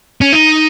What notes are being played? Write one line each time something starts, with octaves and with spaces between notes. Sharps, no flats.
C#4
D#4